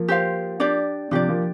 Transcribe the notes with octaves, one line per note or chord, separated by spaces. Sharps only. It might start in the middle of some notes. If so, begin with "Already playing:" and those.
Already playing: F3 A#3
G4 C5 F5
D4 G4 D5
C3 F3 D4 G4 D5
F3 A#3